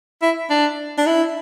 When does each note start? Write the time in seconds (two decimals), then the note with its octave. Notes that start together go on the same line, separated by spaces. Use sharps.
0.22 E4
0.50 D4
0.98 D4
1.06 E4